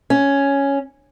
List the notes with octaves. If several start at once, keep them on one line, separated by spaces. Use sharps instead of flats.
C#4